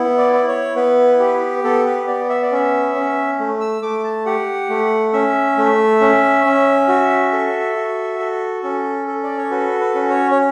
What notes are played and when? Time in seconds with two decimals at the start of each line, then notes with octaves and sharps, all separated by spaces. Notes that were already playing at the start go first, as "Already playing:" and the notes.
Already playing: B3 E4
0.18 D5
0.33 E4
0.48 C#5
0.76 B3 B4
1.19 G4
1.64 B3 A4
1.86 B4
2.07 B3 D5
2.29 E5
2.42 D5
2.52 C#4 E5
2.95 C#4
3.39 A3
3.61 E6
3.82 A3 D6
4.04 A5
4.26 G4 F#5
4.69 A3
5.13 C#4 E5
5.57 A3
6.01 C#4
6.45 C#4
6.88 F#4
7.32 A4
7.76 F#4
8.19 A4
8.63 C#4 A4
9.07 A4
9.24 D5
9.37 C#5
9.50 F#4 B4
9.80 B4
9.95 C#4
10.10 C#5
10.31 C#5